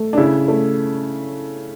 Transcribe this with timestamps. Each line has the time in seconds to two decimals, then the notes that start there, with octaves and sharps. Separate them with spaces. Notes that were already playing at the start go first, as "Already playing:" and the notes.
Already playing: A3
0.13 D4
0.17 C#3 E4
0.48 A3